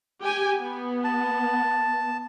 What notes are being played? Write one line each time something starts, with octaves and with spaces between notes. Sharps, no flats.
G4 G5 G#5
B3
A5